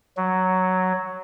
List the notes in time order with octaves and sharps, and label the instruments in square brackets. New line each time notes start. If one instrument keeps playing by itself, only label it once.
[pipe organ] F#3